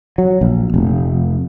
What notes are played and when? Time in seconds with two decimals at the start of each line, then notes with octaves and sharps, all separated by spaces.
0.18 F#3
0.41 A#1
0.74 F1